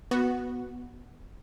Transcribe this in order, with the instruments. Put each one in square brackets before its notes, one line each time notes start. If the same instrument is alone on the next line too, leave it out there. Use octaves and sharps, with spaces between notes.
[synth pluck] B3 F#4